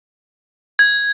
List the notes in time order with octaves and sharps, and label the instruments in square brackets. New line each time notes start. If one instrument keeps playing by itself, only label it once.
[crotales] G#6